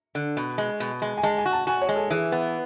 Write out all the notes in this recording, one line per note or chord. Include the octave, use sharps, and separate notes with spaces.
D3
B2
G#3
B2
G#3
G#5
G#3 A5
G#5
F#4
A5
F#4 G#5
C#5
G#3
A4
E3 G#4
B3